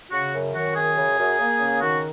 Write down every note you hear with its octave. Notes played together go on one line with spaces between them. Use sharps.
C#3 F#4
F#2
D#3 F#4
F#2 G#4
C#3
F#2
A#3
C#3
D#3 F#4